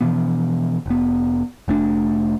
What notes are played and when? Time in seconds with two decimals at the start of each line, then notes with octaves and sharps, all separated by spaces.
0.01 B2 E3 F3 B3
0.86 F1 B3
1.68 F1 A3 D4